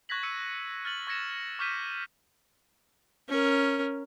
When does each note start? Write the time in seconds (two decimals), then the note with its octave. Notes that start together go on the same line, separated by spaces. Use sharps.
0.09 C#6 F#6 G#6 A#6 B6 F#7
0.23 E6 C#7 D#7
0.85 F6 A6 F#7
1.07 C#6 G#6 A#6 C#7 E7
1.59 C#6 D6 F6 G6 B6 D#7
3.29 C#4 A#4